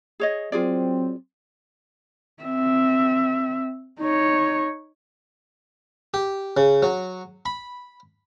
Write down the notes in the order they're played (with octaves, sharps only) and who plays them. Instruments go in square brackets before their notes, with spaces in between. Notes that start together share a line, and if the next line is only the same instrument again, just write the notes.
[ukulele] G#4 C#5 D#5
[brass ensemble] F#3 C4 [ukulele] F4 G#4 D5
[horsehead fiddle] C4 E5
D#4 C#5
[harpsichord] G4
C#3
F#3
B5